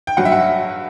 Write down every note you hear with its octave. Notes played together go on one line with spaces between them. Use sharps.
G5
G2 F#3 F#5
E5
F#5